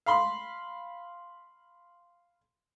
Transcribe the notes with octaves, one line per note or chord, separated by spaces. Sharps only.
F5 B5 C6